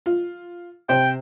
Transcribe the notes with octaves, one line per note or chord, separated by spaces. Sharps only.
F4
C3 C5 G5